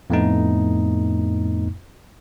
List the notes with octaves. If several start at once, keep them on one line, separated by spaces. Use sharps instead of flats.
F2 A2 A3 B3 D#4